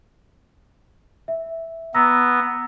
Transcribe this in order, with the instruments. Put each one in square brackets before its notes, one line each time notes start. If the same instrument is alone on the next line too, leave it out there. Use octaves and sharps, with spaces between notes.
[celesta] E5
[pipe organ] B3 [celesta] A#5 E6 A#6